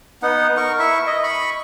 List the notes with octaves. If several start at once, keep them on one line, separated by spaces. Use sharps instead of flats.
B3 D#4 F#5
A#4 C#6
E4 E5 C#6
D#5
B5 C#6